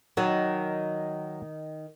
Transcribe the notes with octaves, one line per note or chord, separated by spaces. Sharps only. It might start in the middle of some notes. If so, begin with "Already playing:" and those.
D#3 F#3